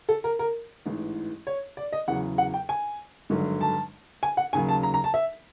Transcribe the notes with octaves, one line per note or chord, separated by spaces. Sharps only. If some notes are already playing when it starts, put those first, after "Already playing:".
A4
A#4
A#4
A1 G#2 E3
C#5
D5
D#5
E2 C#3 F#3 F#5
F#5
G5
G#5
G#1 G2 D3 F#3
A5
G#5
F#5
D#2 C#3 F#3 G#5
A5
A#5
A#5
A5
E5